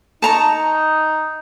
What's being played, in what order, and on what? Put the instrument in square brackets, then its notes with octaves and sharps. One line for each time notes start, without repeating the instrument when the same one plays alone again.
[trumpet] D#4 [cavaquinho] A5 A#5 C#6